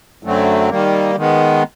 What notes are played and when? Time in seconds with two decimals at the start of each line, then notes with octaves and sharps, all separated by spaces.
0.23 F#2 D3 F#3 A3 C4
0.69 D#3 G3 A#3
1.16 D#3 G#3 B3